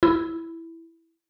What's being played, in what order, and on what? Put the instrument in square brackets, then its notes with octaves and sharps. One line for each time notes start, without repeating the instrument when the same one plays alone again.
[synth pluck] E4